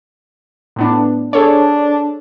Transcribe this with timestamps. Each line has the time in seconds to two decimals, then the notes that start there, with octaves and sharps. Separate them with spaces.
0.76 A2 B3 D4
1.33 D4 G#4 A4 C#5